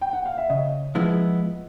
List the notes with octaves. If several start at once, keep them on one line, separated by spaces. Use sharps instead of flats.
G5
F#5
F5
E5
C#3 D#5
F3 G#3 B3 E4